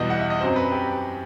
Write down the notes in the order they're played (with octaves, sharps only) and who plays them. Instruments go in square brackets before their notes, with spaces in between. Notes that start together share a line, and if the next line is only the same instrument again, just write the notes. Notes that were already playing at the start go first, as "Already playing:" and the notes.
Already playing: [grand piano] E2 B2 G3 D#5
F#5
E5
D#5
F#2 F#3 C4 C5
B4
G4